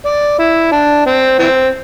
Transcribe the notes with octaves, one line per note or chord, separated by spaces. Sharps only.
D5
E4
D4
C4
E3 C4